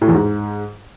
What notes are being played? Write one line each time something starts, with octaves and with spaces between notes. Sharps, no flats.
A2
E2
G#2